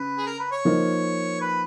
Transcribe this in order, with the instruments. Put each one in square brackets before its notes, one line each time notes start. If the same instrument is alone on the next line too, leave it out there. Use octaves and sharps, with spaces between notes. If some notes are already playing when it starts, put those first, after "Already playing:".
Already playing: [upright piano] C#3 [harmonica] B4
[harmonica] G#4
A#4
B4
C#5
[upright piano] F3 A#3 D#4 A#4
[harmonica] B4